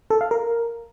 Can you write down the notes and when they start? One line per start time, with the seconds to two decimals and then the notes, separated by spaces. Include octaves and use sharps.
0.10 A4
0.21 F5
0.31 A#4